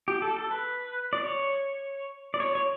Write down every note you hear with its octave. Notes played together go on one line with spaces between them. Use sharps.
G4
A4
A4
B4
D5
C#5
D5
C#5
C#5